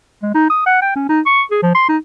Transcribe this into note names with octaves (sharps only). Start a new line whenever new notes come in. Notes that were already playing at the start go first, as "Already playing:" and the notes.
G#3
D#4
D#6
F#5
G5
C#4
D#4
C#6
G#4
F3
C6
D#4